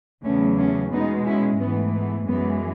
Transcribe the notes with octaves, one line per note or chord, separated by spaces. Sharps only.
E2 C#3 F#3 A3 C#4
A3 C#4
B2 G#3 B3 D#4
C#4 E4
G#2 E3 A3 B3
B3
F#2 E3 G#3 B3